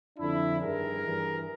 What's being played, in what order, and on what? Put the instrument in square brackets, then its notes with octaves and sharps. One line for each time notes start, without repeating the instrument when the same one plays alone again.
[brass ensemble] F2 D3 D4 E4
G2 D#3 G#4 A#4
G2 E3